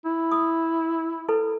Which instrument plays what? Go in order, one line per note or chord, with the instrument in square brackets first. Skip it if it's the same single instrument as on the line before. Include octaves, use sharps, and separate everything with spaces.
[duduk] E4
[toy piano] D#6
E4 A4 B4